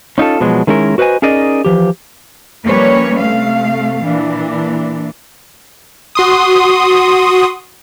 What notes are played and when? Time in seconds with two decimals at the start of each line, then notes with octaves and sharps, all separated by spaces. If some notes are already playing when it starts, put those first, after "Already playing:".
0.18 C#4 D#4 F4 A4
0.40 B2 F3 F#3 G#3
0.67 D#3 G#3 C#4 E4 A#4
0.98 F#4 B4 C5 D#5 G#5
1.22 C#4 D#4 G#4 A#4 D5 D#5
1.65 E3 F3 G4
2.65 F3 G3 A#3 C#4 B4 C#5
3.19 C3 A3 F5
4.04 A#2 E3 D4
6.15 F#4 C6 D#6